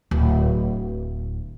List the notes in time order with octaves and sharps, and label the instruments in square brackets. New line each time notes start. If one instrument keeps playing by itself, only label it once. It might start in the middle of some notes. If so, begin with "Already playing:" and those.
[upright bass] D1